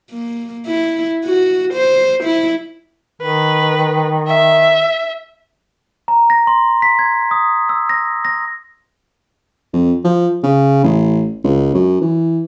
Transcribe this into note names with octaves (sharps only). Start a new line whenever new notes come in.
A#3
E4
F#4
C5
E4
D#3 B4
E5
A#5
A#6
C6
B6
G#6
D#6
E6
A#6
A#6
F2
F3
C#3
A1
C#2
F#2
E3